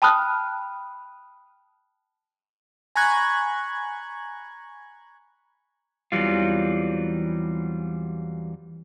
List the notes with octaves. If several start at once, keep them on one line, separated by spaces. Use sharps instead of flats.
G5 A5 B5 D#6 F6 F#6
G#5 A#5 B5 C#6 F#6 G#6
E2 E3 F#3 G3 C4 F4